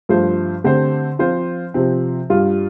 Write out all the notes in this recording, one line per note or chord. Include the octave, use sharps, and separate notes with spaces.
G2 F3 A3 F4 C5
D3 A3 C4 G4 C5
F3 C4 F4 C5
C3 F3 C4
G2 G3 F4